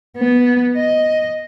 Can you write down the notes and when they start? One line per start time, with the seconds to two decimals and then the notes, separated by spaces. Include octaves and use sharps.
0.17 B3
0.76 D#5